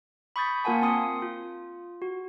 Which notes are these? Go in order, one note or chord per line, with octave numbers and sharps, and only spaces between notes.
B5 C#6 D#6 G6 A6 B6
A#3 F4 A#4 F#5 G#5 A5
C4 C6 D#6 C#7
F4
F#4